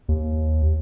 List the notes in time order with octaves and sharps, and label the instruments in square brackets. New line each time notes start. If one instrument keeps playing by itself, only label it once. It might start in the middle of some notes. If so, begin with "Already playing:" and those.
[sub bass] D#2